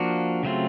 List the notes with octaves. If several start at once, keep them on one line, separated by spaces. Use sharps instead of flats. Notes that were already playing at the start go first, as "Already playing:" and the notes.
Already playing: F3 A#3 D4 F#4
C#3 F#3 A3 C4 F4